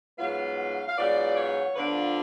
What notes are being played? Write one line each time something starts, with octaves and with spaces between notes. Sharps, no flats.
G#2 F#3 B3 F4 F5
F5
G#2 F#3 B3 F4 D5
C#5
D3 F3 B3 D4 F4 B4